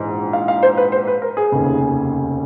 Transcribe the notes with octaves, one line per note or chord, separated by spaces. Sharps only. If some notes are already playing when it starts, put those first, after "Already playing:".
Already playing: A#1 G#2 E3
F5
F5
C5
B4
C5
B4
A#4
G#4
F1 D#2 C#3